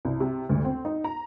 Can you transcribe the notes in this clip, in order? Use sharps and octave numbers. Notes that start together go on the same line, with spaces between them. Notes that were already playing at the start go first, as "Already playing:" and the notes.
C2
C3
D2
C4
D#4
A#5